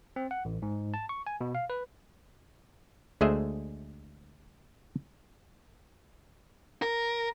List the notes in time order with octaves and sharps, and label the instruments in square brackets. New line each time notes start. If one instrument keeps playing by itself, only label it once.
[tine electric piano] C4
F#5
A1
G#2
A5
C#6
G#5
B2
F5
B4
[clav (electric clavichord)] D2 G#3 A3 G#4 C5 E5
[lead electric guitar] A#4